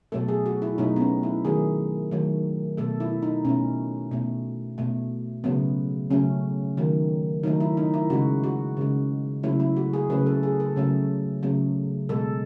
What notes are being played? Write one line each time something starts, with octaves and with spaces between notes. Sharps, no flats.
B2 F#3 A3 A4
G#4
F#4
E4
B2 F#3 A3 D#4
B3
C#4
E4
D#3 F#3 A3 G#4
D#3 F#3 A3
B2 A3 A4
E4
D#4
B2 A3 C#4
B2 A3
B2 A3
C#3 F#3 A3 B3
C#3 F#3 A3 C#4
D#3 F#3 A3
D#3 F#3 A3 D#4
E4
D#4
E4
C#3 G#3 F#4
F#4
C#3 G#3
C#3 F#3 A3 E4
E4
F#4
G#4
C#3 F#3 A3 B4
A4
G#4
A4
C#3 F#3 A3
C#3 F#3 A3
B2 G#3 A4